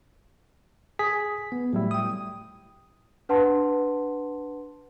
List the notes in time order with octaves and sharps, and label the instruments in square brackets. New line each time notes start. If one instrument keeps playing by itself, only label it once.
[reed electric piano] G#4 [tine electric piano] B6
[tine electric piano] B3
[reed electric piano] A2 G3 E4 [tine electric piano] F#3
[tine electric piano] G5 D#6
[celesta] D4 B4 F#5 A5 C6